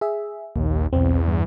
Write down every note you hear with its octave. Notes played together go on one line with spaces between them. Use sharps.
G#4 E5
A#1 D#2
B1 E2 C4
G2